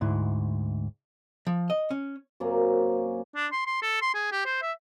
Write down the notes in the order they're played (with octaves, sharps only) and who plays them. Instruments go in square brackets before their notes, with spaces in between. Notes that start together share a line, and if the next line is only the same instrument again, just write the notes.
[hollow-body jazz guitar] D2 G#2 E4
F3
D#5
C#4
[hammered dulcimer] F#2 C3 A#3 C#4
[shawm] D4
C6
C6
A4
C6
G#4
G4
C5
E5